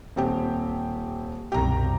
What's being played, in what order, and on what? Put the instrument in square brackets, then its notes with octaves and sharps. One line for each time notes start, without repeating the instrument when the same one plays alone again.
[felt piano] D#1 C4 G4
[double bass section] C2 F#2 B2 [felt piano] G4 A#5